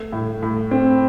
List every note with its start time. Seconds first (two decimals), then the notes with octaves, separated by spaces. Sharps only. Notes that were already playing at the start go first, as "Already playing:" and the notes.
Already playing: A3
0.12 A2
0.43 A2
0.71 C4